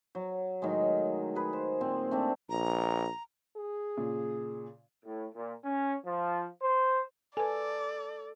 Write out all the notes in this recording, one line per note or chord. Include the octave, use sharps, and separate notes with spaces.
F#3
A2 D#3 F#3 G#3
G#4 B4
C5
A#2 C4 G#5
A3 C4 D4
A#1 A#5
G#4
A#2 C#3
A2
A#2
C#4
F3
C5
A4 B4 D5 G#5